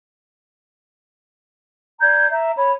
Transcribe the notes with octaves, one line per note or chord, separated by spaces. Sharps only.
D5 A#5 G6 G#6
E5 A#5
C#5 B5